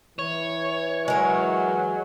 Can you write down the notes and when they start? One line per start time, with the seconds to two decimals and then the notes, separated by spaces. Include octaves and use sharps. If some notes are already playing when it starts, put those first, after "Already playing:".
0.19 E3 C#5
1.08 F#3 G#3 A#4